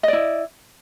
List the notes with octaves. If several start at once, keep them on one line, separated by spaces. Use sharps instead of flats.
E4 D5 D#5